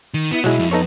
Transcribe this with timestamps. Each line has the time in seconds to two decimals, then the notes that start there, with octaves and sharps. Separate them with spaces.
0.14 D#3
0.31 B3 E4
0.44 B1 F#3 G#3 E4
0.59 F2
0.71 B3 D#4 A4 C#5